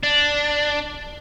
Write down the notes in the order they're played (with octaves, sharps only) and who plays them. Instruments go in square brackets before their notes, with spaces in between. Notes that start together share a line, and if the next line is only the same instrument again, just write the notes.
[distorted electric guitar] D4